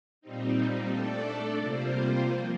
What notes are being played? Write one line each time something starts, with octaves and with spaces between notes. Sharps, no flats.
A#2 G3 C4 D#4
A3 D4 A4 D5
C3 G3 A#3 F4 C5
F3 A#3